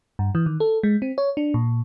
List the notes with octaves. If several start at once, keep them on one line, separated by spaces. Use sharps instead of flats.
G2
E3
D#3
A4
G#3
C4
C#5
D4
A#2